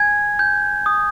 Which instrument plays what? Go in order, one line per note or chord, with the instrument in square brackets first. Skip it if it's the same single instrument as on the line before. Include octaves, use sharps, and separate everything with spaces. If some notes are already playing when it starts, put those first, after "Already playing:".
Already playing: [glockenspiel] G#5 G#6
G6
D#6